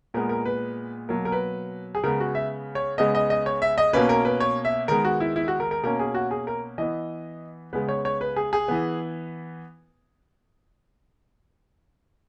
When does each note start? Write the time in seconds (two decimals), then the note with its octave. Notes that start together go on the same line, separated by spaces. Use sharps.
0.14 A#2 G#3 B3 A#4
0.29 A#4
0.45 B4
1.08 B2 F#3 A#3 A#4
1.25 A#4
1.32 B4
1.95 G#4
2.04 C#3 G#3 B3 A#4
2.20 F#4
2.35 E5
2.75 C#5
2.98 C#3 G#3 B3 D#5
3.15 D#5
3.30 D#5
3.46 C#5
3.62 E5
3.78 D#5
3.93 B2 A#3 C#4 B4
4.09 A#4
4.25 B4
4.40 C#5
4.65 E5
4.88 D#3 G#3 B3 A#4
5.05 F#4
5.20 E4
5.36 E4
5.48 F#4
5.60 A#4
5.71 A#4
5.83 B2 A#3 C#4 A#4
5.99 G#4
6.14 F#4
6.31 G#4
6.47 A#4
6.78 E3 B3 D#5
7.73 C#3 G#3 B3 B4
7.89 C#5
8.05 C#5
8.21 B4
8.36 G#4
8.53 G#4
8.68 E3 B3